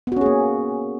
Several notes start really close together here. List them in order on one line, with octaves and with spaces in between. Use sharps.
B3 F#4 C#4 G#4 A#3